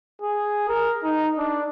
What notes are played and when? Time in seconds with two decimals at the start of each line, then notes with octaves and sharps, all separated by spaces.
0.21 G#4
0.68 A#4
1.04 D#4
1.38 D4